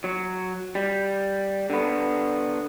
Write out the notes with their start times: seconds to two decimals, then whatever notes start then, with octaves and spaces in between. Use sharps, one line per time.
0.04 F#3
0.75 G3
1.70 D3 B3